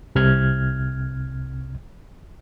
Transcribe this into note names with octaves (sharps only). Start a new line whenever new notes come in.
C2 C3 F6 G#6